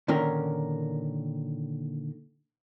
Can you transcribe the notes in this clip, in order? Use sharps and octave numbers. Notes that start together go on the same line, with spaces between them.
A#2 D3 D#3 C#4 A#4